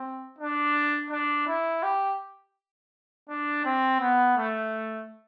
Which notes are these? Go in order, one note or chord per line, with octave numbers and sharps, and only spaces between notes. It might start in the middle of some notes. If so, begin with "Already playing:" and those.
Already playing: C4
D4
D4
E4
G4
D4
C4
B3
A3